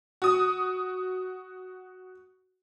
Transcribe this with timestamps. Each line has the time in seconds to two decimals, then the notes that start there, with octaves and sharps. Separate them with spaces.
0.22 F#4 D#6